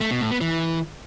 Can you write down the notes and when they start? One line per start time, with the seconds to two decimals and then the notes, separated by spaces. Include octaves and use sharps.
0.01 A3
0.11 B2
0.21 A2
0.31 B3
0.41 E3